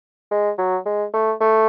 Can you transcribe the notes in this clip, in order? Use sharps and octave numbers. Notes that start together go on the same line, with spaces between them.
G#3
F#3
G#3
A3
A3